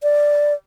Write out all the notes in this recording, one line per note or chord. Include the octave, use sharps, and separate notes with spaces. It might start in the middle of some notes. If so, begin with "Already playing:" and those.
D5